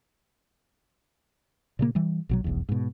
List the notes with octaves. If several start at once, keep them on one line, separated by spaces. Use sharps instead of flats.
A#2 C#3 A#3
E3 G3
A#1 B2 F#3
F1 B1 E2
G#2 B2